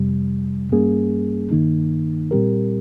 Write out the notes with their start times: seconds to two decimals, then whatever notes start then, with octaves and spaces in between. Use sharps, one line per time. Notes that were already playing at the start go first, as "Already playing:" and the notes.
Already playing: F2 C3 G3
0.71 G2 G3 A#3 C#4 G#4
1.51 G2 D#3 A#3 D#4
2.31 A#2 G3 C4 G4 A#4